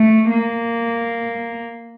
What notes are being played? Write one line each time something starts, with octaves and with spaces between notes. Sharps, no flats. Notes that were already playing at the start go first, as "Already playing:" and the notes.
Already playing: A3
A#3